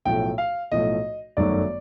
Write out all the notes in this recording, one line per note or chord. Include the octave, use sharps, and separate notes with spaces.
B1 A2 F3 A3 G5
F5
B1 A2 F3 A3 D#5
G1 F#2 D#3 F#3 A3 D5